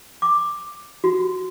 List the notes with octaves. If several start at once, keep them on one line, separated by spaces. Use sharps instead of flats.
D6
F#4